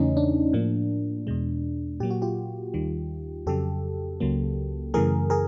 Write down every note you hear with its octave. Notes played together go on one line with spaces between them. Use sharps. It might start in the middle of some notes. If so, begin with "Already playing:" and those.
Already playing: E2 C#3 E3 A3 C#4 D#4
D4
A2 F3 A#3
E2 B2 G#3
A#2 F#3 A#3 G4
F#4
F4 G4
D#2 D#3 G3
F2 C#3 F#3 G4 A4
C#2 C#3 F#3 A#3
F#2 C#3 E3 A3 G#4 A#4
G#4 A#4